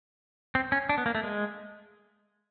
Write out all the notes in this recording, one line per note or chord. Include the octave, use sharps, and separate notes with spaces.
C4
C#4
D4
B3
A#3
A3
G#3